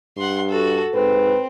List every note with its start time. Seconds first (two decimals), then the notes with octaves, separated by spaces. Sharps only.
0.17 G2 F#5 C6
0.49 F#4 A4
0.94 G#2 C4 B4